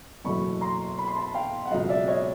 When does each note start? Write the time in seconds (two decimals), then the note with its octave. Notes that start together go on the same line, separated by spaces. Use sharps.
0.24 F#1 E2 B2 F#3 A3 B5 C#6
0.61 A#5 C6
0.99 B5
1.08 C6
1.16 A5 B5
1.34 F5 G5
1.65 F#5
1.70 C#2 B2 F#3 A3 D#5 F5
1.89 D5 E5
2.08 C#5 D#5